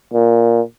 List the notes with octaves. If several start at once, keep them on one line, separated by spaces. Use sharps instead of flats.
A#2